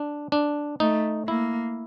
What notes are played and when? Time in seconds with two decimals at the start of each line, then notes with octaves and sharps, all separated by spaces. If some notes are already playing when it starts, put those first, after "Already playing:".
Already playing: D4
0.32 D4
0.80 A3 D#4
1.28 A#3 E4